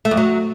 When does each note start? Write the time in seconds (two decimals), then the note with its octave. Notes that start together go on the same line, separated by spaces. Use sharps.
0.05 A3
0.11 F2
0.17 F#3